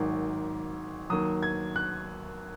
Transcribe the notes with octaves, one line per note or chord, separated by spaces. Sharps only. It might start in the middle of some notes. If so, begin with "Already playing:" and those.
Already playing: G#1 G#2 D#3 F#3
D#2 D#3 F#3 D#6
G#6
F#6